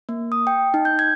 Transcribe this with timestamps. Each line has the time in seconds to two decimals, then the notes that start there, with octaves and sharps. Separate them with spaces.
0.09 A#3
0.32 D#6
0.47 G5
0.74 D#4
0.85 G6
0.99 G#6